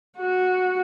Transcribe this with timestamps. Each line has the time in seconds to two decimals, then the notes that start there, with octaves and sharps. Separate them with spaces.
0.17 F#4